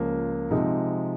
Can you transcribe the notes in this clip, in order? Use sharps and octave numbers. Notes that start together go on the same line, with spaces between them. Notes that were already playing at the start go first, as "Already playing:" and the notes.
Already playing: C#2 C#3 F3 A#3
C3 F3 G#3 D#4